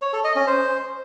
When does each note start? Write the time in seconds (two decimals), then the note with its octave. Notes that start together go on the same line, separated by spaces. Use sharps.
0.02 C#5
0.13 A4
0.24 D#5
0.36 C#4
0.47 C5